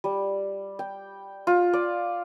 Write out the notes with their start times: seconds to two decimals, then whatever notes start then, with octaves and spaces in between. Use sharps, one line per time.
0.04 G3
0.79 G5
1.47 F4
1.73 D5